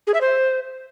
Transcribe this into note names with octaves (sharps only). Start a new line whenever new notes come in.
G#4
E5
C5